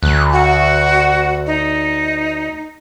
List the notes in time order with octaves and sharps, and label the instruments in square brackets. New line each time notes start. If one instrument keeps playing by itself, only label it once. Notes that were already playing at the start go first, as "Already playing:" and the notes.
[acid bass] D2 [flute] F#6
[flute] F#4
D#4